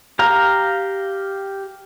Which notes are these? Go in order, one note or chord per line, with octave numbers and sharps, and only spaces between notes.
G4 F5 A#5